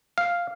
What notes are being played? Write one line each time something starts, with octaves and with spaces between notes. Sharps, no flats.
F5